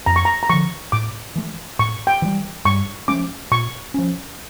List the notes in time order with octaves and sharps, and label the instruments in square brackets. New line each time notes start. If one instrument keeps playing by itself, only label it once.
[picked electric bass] F2 [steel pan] A#5
[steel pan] C#6
A#5
A#5
[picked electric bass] D3 F3 [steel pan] C#6
[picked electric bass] A2 [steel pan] D6
[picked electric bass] E3 A3
[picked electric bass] A2 [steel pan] C#6
[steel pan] G5
[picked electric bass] E3 G3
[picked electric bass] G2 [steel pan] C#6
[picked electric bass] F3 A3 C#4 [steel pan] D6
[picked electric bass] A#2 [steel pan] C#6
[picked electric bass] F3 C#4